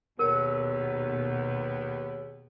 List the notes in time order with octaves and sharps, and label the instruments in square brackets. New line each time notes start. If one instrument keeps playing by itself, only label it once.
[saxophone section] D#2 B3 [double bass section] B2 [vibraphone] G#4 C#5 E6 [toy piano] A#4